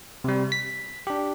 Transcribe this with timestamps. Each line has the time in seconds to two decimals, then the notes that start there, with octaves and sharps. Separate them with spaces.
0.24 C3 G3
0.52 B6
1.07 D4 G4